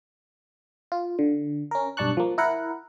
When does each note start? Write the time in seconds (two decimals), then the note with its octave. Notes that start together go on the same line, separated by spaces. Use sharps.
0.92 F4
1.19 D3
1.71 C#4 A#4
1.97 B1 G2 D4 A5 C#6 F#6
2.17 F3 A#3
2.38 E4 A#4 F#5